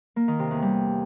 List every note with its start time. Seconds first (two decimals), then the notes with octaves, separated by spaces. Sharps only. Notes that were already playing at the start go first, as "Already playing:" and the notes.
0.16 A#3
0.28 D#3
0.39 C3
0.51 E2
0.62 G3